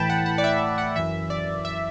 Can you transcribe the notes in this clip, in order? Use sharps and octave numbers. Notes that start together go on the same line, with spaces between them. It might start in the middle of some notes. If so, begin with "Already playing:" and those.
Already playing: A2 E3 G5 A5 B5
F#5
F#5
D5
E5
F#5
F#2 E3 E5
D5
E5